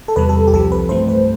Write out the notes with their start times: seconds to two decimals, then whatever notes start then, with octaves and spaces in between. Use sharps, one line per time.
0.08 A4
0.16 E2 C3 G3 B4
0.29 A4
0.48 G4
0.53 C2 C3 F3 A4
0.72 B4
0.89 G2 E3 A3 C5
1.08 B4